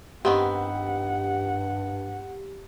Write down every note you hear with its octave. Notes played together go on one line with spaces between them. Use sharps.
G2 D#3 B3 C4 G4 F#5